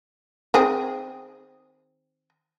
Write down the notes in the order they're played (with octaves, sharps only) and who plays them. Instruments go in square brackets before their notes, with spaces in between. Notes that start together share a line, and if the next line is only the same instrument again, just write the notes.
[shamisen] D#3 C4 G#4